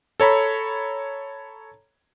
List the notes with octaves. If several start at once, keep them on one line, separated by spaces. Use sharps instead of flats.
A4 C#5 A#5 B5